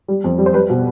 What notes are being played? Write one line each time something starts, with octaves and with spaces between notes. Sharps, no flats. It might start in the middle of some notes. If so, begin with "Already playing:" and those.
G3
F2
G3
C5
G3 B4
B2